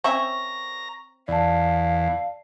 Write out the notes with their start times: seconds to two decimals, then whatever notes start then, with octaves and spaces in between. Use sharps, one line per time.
0.04 C4 C#4 E5 A#5 C#6
1.28 E2 D5 F5 A5